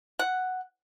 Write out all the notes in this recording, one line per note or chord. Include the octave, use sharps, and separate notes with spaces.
F#5